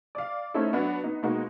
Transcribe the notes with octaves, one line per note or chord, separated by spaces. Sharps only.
D5 F5
A3 C4 C#4 D#4 E4 A4
F#3 B3 D4 F#4
B3 D#4
B2 G#3 A#3 D#4 F#4